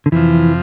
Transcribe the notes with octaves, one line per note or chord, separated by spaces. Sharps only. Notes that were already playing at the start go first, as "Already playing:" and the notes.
D3
F2 C3 E3 F3